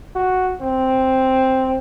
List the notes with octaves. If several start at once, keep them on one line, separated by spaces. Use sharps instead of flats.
F#4
C4